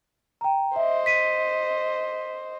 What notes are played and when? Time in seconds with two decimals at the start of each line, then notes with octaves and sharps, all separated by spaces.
0.41 G5 A#5
0.76 C5 D#5 E5
1.06 B6 D#7